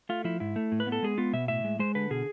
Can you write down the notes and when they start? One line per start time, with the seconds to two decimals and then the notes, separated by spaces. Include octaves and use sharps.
0.09 A3 F4
0.24 F3 E4
0.40 G#2 E4
0.56 A3
0.72 A2
0.80 B4
0.87 B3
0.92 A4
1.03 G#3 G#4
1.18 B3 F4
1.33 B2 E5
1.48 A2 E5
1.64 G#3
1.79 G#3 C5
1.95 D3 B4
2.10 B2 G#4